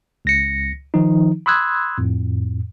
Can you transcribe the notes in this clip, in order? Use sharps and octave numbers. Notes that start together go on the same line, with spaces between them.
C#2 A#6 C#7
D#3 F3 D#4
B5 C6 D#6 E6 F#6 G#6
F2 A2